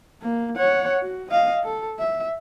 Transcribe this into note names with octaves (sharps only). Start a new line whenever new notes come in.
A#3
C#5 F#5
F#4
D#5 F5
A4
E5